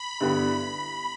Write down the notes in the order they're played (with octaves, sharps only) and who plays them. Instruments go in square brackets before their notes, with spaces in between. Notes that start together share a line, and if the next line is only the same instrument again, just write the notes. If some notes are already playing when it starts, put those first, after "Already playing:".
Already playing: [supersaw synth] B5
[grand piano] G2 D3 G3 B3 E4